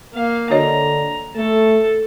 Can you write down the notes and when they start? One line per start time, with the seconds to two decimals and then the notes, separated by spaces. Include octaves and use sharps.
0.14 A#3 F5
0.51 D3 F#4 C#5 D#5 A#5
1.36 A3 A4